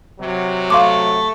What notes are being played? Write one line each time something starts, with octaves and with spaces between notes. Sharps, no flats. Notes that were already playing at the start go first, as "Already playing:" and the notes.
C3 F#3
A3 F5 C6 D6